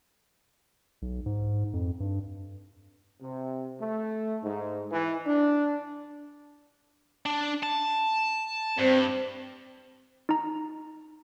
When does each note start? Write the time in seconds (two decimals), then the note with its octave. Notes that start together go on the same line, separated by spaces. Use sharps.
1.02 B1
1.26 G#2
1.73 F2
2.00 G2
3.21 C3
3.79 A3
4.43 G#2
4.90 E3
5.26 D4
7.26 D4
7.63 A5
8.79 G2 C4
10.29 D#4 A#5